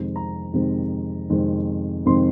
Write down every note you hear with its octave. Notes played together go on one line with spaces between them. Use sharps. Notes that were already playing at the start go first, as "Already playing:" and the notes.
Already playing: F2 C3 D#3 G#3
A#5
F2 C3 D#3 G#3
F2 C3 D#3 G#3
F2 C3 D#3 G#3 C6